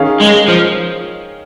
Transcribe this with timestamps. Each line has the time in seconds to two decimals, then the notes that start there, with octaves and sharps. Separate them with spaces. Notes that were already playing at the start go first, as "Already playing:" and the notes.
Already playing: D#3 C#4 G#4 F5
0.21 G#3
0.49 F3